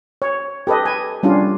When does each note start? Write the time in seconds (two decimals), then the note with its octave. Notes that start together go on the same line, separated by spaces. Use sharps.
0.22 C#5
0.67 G4 A4 B4 D#5
0.86 G#5
1.23 G3 C#4 D4 F4